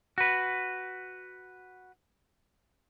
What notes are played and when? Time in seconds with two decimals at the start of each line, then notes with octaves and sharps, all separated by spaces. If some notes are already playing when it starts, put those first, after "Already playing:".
0.18 F#4 B4